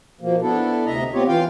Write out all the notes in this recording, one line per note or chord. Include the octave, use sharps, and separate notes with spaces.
B2 F3 A#3
B3 D4 E4 A4
D2 C3 D#5 E5 A#5
B3 C4 F4 G4 C#5
E3 F4 F5 G5